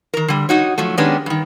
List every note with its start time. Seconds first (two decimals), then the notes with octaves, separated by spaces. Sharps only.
0.14 D#3 A#4
0.28 D3 G3
0.49 D#4 F#4 C#5
0.78 F3 F#3 A3
0.97 D#3 G#3 B3 C#4 D4 G4
1.26 G2 D#3